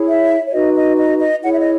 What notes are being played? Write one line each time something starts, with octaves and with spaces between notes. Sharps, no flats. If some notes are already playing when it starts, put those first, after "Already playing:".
Already playing: E4 G#4 C#5
E5
C#5
D#4 F#4 B4 D#5
D#5
D#5
D#5
E4 G#4 C#5 F#5
E5
D#5